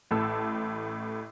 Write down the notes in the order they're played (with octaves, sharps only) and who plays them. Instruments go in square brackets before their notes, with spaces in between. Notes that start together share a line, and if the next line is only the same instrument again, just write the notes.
[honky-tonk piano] A1 A2 A4 E6